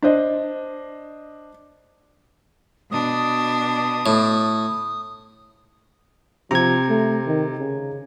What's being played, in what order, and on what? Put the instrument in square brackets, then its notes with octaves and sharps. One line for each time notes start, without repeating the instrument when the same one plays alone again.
[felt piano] D4 C5 D#5
[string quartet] B2 D4 [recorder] D#6
[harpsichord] A2
[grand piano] C3 [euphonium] F3 [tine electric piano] A#5 G#6
[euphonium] A3
D#3
C#3